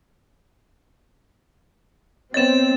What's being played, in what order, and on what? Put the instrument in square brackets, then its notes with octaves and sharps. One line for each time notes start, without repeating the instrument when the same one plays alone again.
[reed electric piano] B3 C#5 D#5 [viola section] C4 [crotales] A6 E7